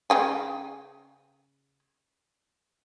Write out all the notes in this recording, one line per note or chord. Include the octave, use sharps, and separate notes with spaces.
C#3 G5 G#5